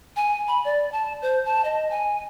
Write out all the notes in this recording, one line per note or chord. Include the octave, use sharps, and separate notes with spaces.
G#5
B5
D5
A5
C5
A5
D#5
G#5